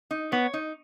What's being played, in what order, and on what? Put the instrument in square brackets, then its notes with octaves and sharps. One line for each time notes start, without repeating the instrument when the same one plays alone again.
[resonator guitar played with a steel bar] D#4
[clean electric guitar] B3 [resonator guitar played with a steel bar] C#5
[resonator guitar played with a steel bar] D#4